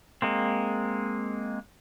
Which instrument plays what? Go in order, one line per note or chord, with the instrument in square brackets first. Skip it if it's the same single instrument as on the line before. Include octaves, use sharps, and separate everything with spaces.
[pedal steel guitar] G#3 A#3 C4